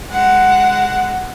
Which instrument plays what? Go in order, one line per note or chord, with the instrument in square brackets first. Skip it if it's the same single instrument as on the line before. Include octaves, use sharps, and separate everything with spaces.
[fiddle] G#3 F#5